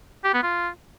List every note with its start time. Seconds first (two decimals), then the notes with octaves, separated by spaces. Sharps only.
0.24 G4
0.34 B3
0.43 F4